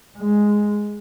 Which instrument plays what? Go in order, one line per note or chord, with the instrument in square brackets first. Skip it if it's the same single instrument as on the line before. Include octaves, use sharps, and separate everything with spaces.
[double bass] G#3